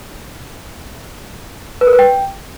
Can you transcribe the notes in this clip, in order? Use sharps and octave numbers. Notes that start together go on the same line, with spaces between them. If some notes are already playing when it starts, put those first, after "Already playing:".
B4
A#4
B4
G5